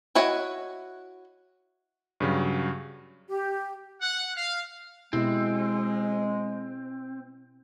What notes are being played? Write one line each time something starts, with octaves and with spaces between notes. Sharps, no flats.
E4 F#4 C#5 D#5
G2 C#3 F#3
G4
F#5
F5
B2 G#3 C4 E4 G4